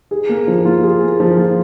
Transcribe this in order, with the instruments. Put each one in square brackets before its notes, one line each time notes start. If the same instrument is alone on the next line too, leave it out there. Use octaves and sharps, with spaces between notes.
[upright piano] G#4
A#3
F3
F4
G#4
A#3
F3
F4